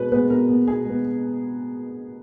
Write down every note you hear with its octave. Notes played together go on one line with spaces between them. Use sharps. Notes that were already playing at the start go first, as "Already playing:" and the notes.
Already playing: B2 G#3 B3 B4
G#3 B3 B4
B2 A#4
G#3 B3
B2 G#4
G#3 B3